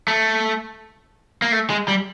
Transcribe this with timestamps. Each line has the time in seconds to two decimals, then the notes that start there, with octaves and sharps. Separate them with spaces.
0.08 A3
1.42 A#3
1.52 A3
1.70 G#3
1.88 G3